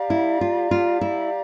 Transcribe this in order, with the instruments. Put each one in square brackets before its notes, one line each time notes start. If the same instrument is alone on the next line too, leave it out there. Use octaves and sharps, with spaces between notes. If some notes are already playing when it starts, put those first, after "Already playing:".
Already playing: [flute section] G4 D5 F5 A#5
[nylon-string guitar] E4
F4
F4
E4